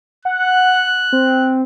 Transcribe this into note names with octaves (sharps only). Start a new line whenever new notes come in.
F#5 F#6
C4